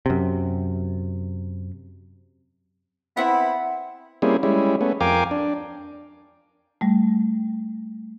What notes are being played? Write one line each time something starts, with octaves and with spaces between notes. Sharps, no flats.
F#2 C3
B3 C4 E4 E5 F#5
G3 A#3 C4 C#4 E4 G#4
G3 G#3 C#4 E4
A3 B3 C#4
F2 A#4 F5 G5 G#5 D6
D4
G3 A3